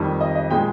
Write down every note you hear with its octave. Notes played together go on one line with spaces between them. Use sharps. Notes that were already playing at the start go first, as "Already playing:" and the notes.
Already playing: F2 D#3 G3
D#5
D#5
A#2 G#3 G5